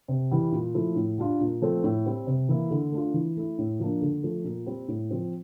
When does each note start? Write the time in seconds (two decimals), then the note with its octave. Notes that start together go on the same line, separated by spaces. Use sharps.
0.08 C3
0.31 E3 G3
0.52 A#2
0.74 F3 A3 E4
0.96 A2
1.18 G3 D4 F4
1.40 A#2
1.62 F3 A3 C4
1.84 A2
2.06 G3 C4
2.27 C3
2.49 E3 A#3 E4
2.71 D3
2.92 A3 D4 F4
3.14 E3
3.37 A3 E4
3.58 A2
3.80 F3 A#3 D4
4.02 D3
4.23 F3 A3
4.44 A#2
4.66 G3 C4
4.88 A2
5.11 F3 C4